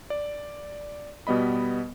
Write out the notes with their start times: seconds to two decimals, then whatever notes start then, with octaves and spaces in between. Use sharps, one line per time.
0.10 D5
1.27 B2 G3 B3 D#5 B5